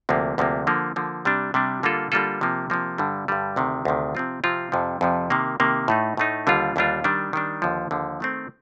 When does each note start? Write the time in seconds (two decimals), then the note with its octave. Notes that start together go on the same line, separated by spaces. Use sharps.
0.09 D2 C3 F3 A#3
0.38 D2 C3 F3 A#3
0.67 D3 F3 A#3
0.96 D3 F3 A#3
1.25 C3 G3 D4
1.54 C3 G3 D4
1.83 D3 G3 A#3 F4 A4
2.12 D3 G3 A#3 F4 A4
2.41 C3 F3 A#3
2.70 C3 F3 A#3
2.98 G2 D3 G3
3.28 G2 D3 G3
3.56 D2 C3 D#3
3.85 D2 C3 D#3
4.15 C3 F3 C4 F4
4.44 C3 F3 C4 F4
4.72 F2 C3 F3
5.01 F2 C3 F3
5.30 C3 D#3 A#3
5.60 C3 D#3 A#3
5.88 A2 A3 D#4
6.17 A2 A3 D#4
6.47 D#2 D3 G3 D4 F4
6.76 D#2 D3 G3 D4 F4
7.04 D#3 G3 D4
7.33 D#3 G3 D4
7.62 D#2 D3 F3
7.91 D#2 D3 F3
8.20 D#3 A3 C4